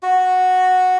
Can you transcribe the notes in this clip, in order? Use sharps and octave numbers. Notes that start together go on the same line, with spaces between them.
F#4